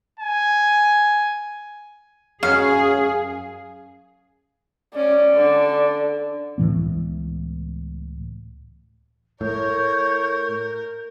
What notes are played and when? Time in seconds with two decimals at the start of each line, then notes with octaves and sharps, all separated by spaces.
0.19 G#5
2.43 F#2 C#4 G#4 F5
4.95 C#4 D5
5.35 D3
6.58 C#2 A2 E3 B3
9.41 A2 A#4 C#5 G6